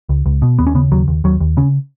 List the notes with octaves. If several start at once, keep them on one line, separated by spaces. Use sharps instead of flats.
C#2
C#2
B2
D#2 B3
C#4
C#3 B3
D#2 F#3
D#2
D#2 F#3
D#2
C#3 C#4